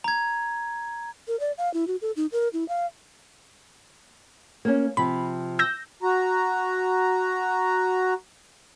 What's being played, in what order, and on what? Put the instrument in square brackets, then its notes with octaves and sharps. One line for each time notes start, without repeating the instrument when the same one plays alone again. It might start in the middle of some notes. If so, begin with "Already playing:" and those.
[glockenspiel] A#5 G#6
[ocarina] A#4
D5
F5
E4
F#4
A4
D#4
A#4
E4
F5
[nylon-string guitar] A#3 C#4
[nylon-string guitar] C3 F3 [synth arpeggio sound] B5
[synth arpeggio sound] E6 G6 A#6
[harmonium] F#4 A#5